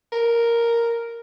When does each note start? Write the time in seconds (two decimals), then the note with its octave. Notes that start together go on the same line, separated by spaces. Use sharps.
0.12 A#4